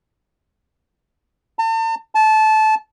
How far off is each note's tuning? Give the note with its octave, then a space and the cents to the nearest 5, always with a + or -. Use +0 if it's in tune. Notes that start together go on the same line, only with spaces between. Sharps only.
A5 +40
A5 -20